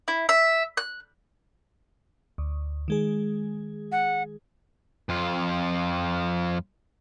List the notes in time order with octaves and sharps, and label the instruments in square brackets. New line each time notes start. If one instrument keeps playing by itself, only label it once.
[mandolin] E4
E5
F#6
[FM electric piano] D2
D#3 G#3 G#4
[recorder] F#5
[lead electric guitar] F2 F4